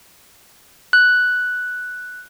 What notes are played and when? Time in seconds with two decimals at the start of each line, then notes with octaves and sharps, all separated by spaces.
0.93 F#6